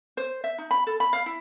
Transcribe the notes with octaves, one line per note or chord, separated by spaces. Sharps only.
C5
E5
D#4
B5
A4
B5
F5
E4